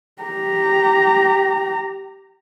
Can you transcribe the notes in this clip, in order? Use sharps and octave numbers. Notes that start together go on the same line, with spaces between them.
G4 A#5